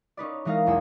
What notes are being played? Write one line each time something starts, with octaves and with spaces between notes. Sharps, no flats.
C#4 D#4 B4 D5
E3 G#3 D#4 A#4 F5 A#6
B1 E2 A#3 G#5 E6